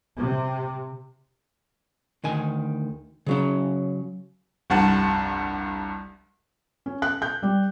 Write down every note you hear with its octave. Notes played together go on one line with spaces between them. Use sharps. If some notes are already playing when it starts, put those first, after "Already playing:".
C3
D2 D#3 G#5
C#3 F#3 C#4
F1 C2 G2 F#5 A5
C#4
F#6
G6
G3